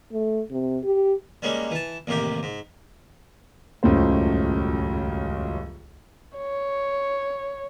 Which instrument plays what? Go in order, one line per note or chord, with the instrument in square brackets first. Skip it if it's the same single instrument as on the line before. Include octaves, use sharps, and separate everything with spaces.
[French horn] A3
C3
G4
[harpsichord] G3 G#3 A#3 C#4
E3 A5
A1 D#2 C3 A#3 G4
G#2
[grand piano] D#1 C#2 F#2 A2 C5
[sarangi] C#5